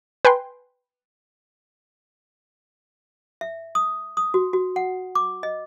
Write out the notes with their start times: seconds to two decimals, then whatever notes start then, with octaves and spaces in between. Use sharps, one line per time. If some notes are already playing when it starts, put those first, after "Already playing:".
0.25 B4 G5 G#5 C6
3.41 E5
3.75 D#6
4.17 D#6
4.34 F#4
4.53 F#4
4.76 F#5
5.15 D6
5.43 D#5